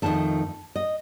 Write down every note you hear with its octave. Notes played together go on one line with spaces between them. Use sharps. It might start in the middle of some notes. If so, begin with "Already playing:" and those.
F2 D#3 A3 A5
D#5